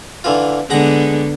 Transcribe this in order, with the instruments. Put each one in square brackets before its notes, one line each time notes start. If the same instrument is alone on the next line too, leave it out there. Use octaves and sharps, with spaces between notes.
[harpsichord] D3 E3 F4
[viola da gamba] D3 B3 [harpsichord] G#3 F#5 A#5